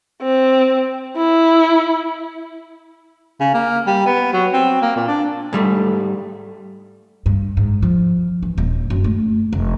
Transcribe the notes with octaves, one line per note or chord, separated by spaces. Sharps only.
C4
E4
C#3
A#3
G3
B3
F#3
C4
A#3
A#2
D4
G#2 G3 A3
G2
G#2
F3
E3
D#1
F#2
A3
F1